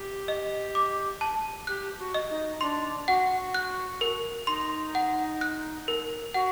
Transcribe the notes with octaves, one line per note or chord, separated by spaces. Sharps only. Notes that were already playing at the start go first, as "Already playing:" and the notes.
Already playing: G4
D#5
D6
A5
G4 F#6
F#4
D#5
D#4
D4 C6
F#4 F#5
F#6
A#4
D#4 C6
F#5
F#6
A#4
F#4 F#5